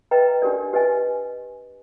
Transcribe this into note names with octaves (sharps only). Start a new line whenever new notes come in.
B4 D#5 G5 A#5
D4 G4 A#4 D5
G4 B4 D#5 G#5